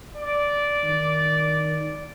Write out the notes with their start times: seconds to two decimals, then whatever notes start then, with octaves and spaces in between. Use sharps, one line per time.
0.17 D5
0.84 D#3